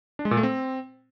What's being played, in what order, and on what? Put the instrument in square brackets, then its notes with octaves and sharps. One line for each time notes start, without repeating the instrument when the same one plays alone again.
[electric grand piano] D4
G#3
A#2
A3
C4